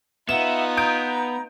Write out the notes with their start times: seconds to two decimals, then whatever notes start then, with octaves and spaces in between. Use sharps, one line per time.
0.29 B3 D#4 F4 E5 F#5 E7
0.77 A#5 D#6 G6 D7